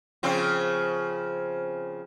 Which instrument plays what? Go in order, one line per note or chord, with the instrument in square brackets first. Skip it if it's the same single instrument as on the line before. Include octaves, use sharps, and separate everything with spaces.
[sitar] C#3 F3 C4